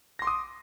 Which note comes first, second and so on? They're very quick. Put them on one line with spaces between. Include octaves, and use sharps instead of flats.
A#6 C6 D6 D#6